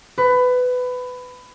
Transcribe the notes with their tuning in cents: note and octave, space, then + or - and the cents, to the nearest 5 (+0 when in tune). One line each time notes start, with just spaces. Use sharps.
B4 +20